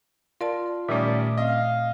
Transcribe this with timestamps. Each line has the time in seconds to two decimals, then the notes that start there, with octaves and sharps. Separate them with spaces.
0.41 F4 A#4 D5 A5
0.89 A#2 D#3 G3 A3 C#4 D5 E5 D#6
1.38 C4 D#5 F5